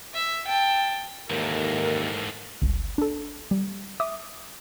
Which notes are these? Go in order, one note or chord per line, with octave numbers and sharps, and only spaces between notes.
E5
G5 A5
D#2 G#2 E3 A4 A#4
G1 C#2
D4 A4
G3
E5 D6 D#6